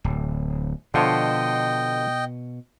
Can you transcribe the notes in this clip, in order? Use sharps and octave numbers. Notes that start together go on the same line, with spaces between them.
D1
B2 D3 F3 C#5 D#5 G5